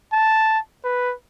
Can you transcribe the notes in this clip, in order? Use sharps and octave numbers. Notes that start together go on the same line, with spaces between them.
A5
B4